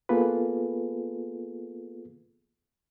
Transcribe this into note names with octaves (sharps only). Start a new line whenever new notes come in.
A#3 B3 F4 G#4 A4 B4